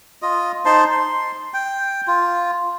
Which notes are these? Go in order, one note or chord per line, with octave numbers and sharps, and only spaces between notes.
F4 D#5
D#4 C5 A5 C6
C6
G5
F4